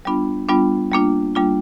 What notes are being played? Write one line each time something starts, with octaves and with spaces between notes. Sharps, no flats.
G3 B3 D4 F4
G3 B3 D4 F4
G3 A#3 D4 F4
G3 A#3 D4 F4